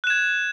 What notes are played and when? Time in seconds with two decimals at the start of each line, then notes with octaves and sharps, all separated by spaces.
0.04 F#6
0.07 E7
0.10 G#6